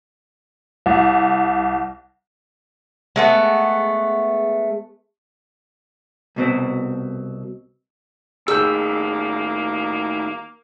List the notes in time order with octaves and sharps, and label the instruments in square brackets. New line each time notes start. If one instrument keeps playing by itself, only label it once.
[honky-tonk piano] C2
[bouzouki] G#3 A3 B3
[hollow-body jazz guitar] C2 B2 C4
[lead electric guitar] A2 D#3 [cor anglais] A#3 [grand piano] G#4 G6 [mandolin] E6